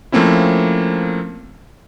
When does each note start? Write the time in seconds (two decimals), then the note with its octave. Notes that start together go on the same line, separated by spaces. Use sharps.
0.12 F3 A3 A#3 C4 C#4 E4